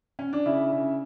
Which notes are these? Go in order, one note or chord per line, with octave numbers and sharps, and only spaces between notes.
C#4
D4
C#3 E4
C#3